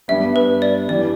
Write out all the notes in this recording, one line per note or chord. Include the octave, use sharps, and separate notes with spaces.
G2 G3 B3 E5
B4
D5
G2 E3 G3 D5